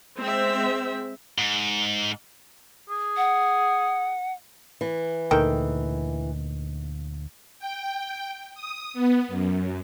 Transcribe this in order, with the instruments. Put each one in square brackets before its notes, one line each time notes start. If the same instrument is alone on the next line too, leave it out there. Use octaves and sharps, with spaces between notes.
[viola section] G#3 C4 C5 E5
[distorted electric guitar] G#2
[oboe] G#4
[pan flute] F#5
[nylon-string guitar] E3
[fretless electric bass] D2 A#2 [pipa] D#3 A4 G5
[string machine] G5
D#6
B3
F#2